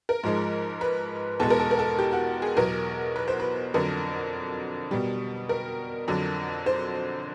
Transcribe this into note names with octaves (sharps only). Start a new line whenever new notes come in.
A#4
G#2 F3 G#3
B4
E2 B2 G#3 A4
A#4
A4
A#4
A4
G4
F#4
G#4
E2 B2 F#3 A#4
B4
C5
B4
F2 D3 F#3 A#4
B2 G3
A#4
F2 D3 F#3
C5